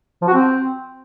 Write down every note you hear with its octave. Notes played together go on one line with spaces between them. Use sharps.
F3
F#4
C4